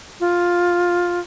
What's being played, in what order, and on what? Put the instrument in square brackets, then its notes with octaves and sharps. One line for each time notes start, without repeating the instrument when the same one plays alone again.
[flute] F4